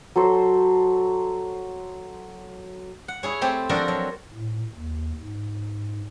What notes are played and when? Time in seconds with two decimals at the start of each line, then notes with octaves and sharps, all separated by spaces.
0.16 F#3 A4 C5
3.08 F#5
3.23 E4 G#4 C#5
3.41 A3 C4 G4
3.69 F3 D4 F#4 A4 A#4 D#5
3.88 F#3
4.34 A2
4.75 D#2
5.19 G#2